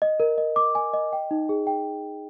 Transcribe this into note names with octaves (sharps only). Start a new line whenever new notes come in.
D#5
A#4
D#5
D6
G#5
D#5
G5
D#4
G#4
G5